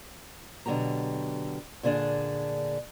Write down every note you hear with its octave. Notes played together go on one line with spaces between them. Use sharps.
B2 D3 F#3 G4 A#5
A#2 D3 D4 G#4